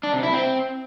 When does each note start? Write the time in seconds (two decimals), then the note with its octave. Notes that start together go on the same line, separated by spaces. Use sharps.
0.03 D4
0.13 C3
0.23 E4
0.33 C4